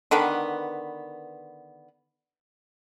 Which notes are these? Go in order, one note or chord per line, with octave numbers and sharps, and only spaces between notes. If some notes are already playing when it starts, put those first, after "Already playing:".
D3 D#3 B3 B4